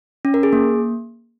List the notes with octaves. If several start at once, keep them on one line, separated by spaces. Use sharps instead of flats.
C#4
A#4
G#4
A#3